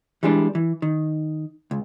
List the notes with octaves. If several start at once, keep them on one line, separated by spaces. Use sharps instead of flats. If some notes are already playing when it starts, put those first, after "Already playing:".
E3 G3 G#3 D4
E3
D#3
C#2